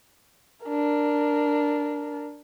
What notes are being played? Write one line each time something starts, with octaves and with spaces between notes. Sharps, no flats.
D4 A#4